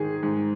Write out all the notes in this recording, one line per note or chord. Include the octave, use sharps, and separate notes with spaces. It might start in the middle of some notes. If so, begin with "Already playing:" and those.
Already playing: G#2 D#3 G#4
G#2